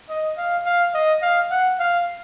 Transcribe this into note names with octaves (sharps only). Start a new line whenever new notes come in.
D#5
F5
F5
D#5
F5
F#5
F5